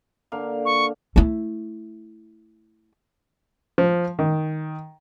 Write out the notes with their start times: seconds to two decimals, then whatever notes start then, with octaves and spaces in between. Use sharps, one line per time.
0.32 D3 A#3 F5
0.65 C#6
1.16 A3 E4
3.78 F3
4.19 D#3